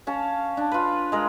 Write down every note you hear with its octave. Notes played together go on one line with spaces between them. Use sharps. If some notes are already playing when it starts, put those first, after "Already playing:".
C#4 F5 A5
D4
F4 B4
G#3 A#4